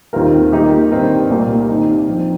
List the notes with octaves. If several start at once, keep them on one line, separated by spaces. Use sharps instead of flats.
D#2 D#3 C4 F4 A#4
D#3 A#3 D#4 G4
G2 D#3 C4 D#4 A#4
C2 A#2 A#3 G4
D#3 C4 D#4
G2 F3 C4